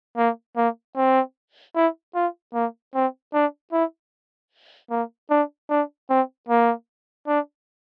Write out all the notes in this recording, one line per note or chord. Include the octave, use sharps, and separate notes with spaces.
A#3
A#3
C4
E4
F4
A#3
C4
D4
E4
A#3
D4
D4
C4
A#3
D4